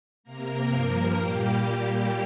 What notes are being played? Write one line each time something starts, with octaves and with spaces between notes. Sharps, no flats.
C3 A#3 A#4
G2 F3 A#3
A#2 G3 A#3 G4